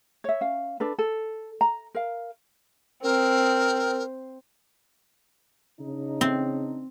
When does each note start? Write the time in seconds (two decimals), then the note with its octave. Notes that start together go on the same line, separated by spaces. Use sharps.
0.24 C#5 E5
0.41 C#4 F5
0.80 D4 A4 B4
0.99 A4
1.61 A#5
1.95 A#4 F5
3.03 C4 A#4
5.80 C#3 D4 D#4
6.21 C4